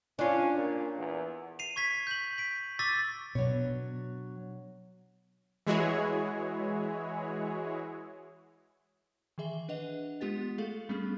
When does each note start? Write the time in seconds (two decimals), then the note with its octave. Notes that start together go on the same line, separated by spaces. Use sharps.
0.19 C#4 D4 F4
0.55 A#2
0.97 E2
1.59 C7 D#7 F7
1.76 C#6 G#6 B6
2.07 G6 F#7
2.38 B6 D7
2.79 C#6 D6 E6 A6 B6 D#7
3.35 B2 F#3 D4 C#5
5.67 E3 G#3 E4 F#4 G#4 C#5
9.38 D#3 E3 G#4 E5 G7
9.69 D4 B4 D#5 F#5 F7
10.21 G#3 B3 F4 G4 F#5 A6
10.58 A3 G#4 A4 F5
10.89 G3 A3 B3 C#4 D4 G#4